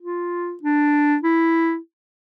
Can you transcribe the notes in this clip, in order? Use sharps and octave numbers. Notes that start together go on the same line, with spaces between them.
F4
D4
E4